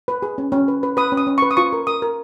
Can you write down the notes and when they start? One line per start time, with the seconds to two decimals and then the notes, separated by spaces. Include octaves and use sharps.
0.08 B4
0.22 G#4
0.38 C#4
0.52 C#4
0.68 B4
0.83 B4
0.97 B4 D#6
1.12 C#4
1.17 D#6
1.27 C#4
1.38 B4 C#6
1.51 D#6
1.57 F4 C#6
1.73 A#4
1.87 A#4 D#6
2.02 A#4